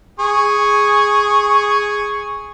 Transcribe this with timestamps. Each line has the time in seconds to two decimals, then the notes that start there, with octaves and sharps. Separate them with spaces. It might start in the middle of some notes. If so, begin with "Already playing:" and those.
0.19 G#4 C#6